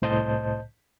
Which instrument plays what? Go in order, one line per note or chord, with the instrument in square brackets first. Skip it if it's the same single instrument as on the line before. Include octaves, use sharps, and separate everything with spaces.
[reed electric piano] C2 A2 C5 D#5 A5 G6